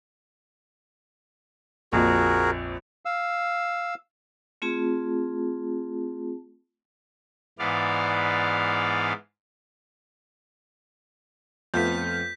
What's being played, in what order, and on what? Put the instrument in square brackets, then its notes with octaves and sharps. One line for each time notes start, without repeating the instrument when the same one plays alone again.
[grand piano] A#1 F2 [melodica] F#4 G#4 A#4
[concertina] F5 E6
[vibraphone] A3 C4 F4 G#4 A5
[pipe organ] G#2 E3 B3 D5 F5
[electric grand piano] F2 [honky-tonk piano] A3 B3 F4 [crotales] G6 B6